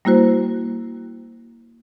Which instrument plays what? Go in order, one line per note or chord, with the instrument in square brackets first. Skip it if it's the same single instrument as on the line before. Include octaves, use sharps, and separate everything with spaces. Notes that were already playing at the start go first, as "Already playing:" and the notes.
[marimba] G3 A#3 E4 F#4 C5